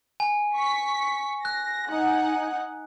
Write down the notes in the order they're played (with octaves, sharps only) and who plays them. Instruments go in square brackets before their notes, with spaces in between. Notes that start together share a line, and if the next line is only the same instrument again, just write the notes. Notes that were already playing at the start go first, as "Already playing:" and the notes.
[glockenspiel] G#5
[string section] C#6 B6
[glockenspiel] F#6 [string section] A#6
[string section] D#4 F#5 G#5